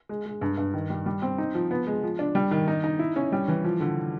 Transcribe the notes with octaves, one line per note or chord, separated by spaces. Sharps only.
G#3
G#3
G2
G2
D#3
G3
G3
C4
D#4
F3
B3
G#3
F3
D4
G3
D#3
D#4
D#4
E4
C#4
G3
E3
F3
D3